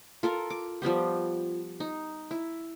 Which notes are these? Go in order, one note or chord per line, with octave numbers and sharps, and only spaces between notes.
F4 A4 A#4
D6
F3 G3 B3 G4
D#4
E4